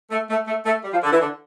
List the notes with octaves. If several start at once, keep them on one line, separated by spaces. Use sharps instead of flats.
A3
A3
A3
A3
G3
F3
D3
E3
D3